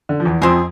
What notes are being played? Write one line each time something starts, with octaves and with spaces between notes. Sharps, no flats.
D3
F3
E2 E3
F2 F3 G#3 C4 G#4